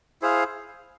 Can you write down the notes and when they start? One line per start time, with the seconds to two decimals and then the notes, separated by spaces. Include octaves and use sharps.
0.22 E4 G#4 C5 F5